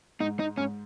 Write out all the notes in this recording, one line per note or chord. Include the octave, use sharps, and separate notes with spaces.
G#2 D#4
D#4
G#2 C#4